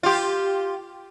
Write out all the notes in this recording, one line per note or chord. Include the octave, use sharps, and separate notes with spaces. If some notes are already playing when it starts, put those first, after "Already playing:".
F4 G4